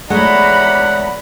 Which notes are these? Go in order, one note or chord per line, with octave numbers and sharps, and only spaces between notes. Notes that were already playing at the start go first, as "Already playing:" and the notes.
E2 G#3 A3 C#5 D5 F#5 A#5 B5